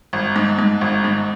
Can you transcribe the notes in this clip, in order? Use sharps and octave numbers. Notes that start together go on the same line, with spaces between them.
G#1
G#2
G#2
G#1
G#2